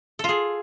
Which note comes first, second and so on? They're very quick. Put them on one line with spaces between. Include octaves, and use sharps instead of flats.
A4 F4 G#4